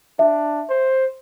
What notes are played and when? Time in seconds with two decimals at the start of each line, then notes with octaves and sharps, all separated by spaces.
0.19 D4 E5
0.69 C5